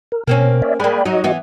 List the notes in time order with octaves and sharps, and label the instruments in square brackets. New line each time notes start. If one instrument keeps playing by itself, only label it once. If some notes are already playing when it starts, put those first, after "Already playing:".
[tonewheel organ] A#4
[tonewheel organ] B2 [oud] A#3 C4 C#4
[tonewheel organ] C#5 D5 E5
[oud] G#3 A#3 [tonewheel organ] D5 G5 B5
[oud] F#3 D#4 [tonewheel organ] F#4 D#5
[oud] E3 B3